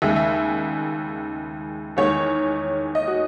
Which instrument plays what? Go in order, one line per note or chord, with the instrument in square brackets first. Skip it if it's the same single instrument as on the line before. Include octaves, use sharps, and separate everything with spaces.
[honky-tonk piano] D#2 C#3 G#3 E5
E5
E2 D#3 G#3 C#5
D#5
F#4